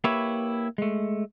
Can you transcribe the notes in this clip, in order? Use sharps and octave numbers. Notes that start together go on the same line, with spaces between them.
A#3 E4 G4 B4 C#5 E5
G#3 A3